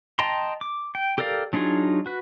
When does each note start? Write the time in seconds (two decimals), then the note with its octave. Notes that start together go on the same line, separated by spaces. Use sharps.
0.19 D#5 G5 A5 A#5 C6
0.61 D6
0.95 G5
1.18 G4 A4 A#4 D5 F5
1.53 F#3 D4 D#4 F4 G#4
2.06 F#4 B4